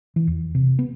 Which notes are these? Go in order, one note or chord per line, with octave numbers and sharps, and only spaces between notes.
E3
E2
C3
B3